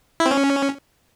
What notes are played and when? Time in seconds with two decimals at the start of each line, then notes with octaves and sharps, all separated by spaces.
0.20 E4
0.26 C4
0.31 C#4